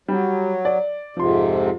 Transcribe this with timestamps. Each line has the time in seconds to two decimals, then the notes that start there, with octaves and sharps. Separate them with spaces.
0.08 F#3 G3
0.65 D5
1.17 F2 G#2 C3 F3 C6